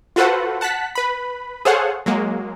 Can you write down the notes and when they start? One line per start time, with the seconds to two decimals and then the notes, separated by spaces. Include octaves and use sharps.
0.16 F4 F#4 A4 B4 C5 F#5
0.61 F#5 A5 F#6 B6
0.95 B4 B5
1.65 G#4 A4 C5 C#5 F5 F#5
2.06 F#3 G#3 A#3